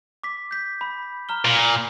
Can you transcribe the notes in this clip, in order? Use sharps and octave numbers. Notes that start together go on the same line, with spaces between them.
D6 B6
G6 B6
B5
A#5 F6 G7
A#2